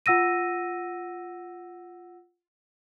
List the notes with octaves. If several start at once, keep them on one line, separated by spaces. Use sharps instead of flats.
F4 F#5 E6 A#6 D#7